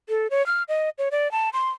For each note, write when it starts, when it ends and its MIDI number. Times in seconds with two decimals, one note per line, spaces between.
0.09 0.27 69
0.31 0.45 73
0.46 0.63 89
0.68 0.90 75
0.98 1.09 73
1.11 1.31 74
1.32 1.49 81
1.53 1.70 84